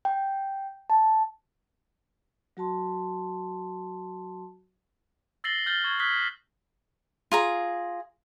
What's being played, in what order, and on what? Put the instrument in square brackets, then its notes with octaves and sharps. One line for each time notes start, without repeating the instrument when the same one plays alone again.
[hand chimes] G5
A5
[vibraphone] F#3 F#4 A5 C6
[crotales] E6 A6 A#6 C7 F#7 G7
F6 G6 A6 F#7 G7
C#6 G#6
D#6 F6 F#6 G#6 B6 G7
[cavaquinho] F4 G#4 A#5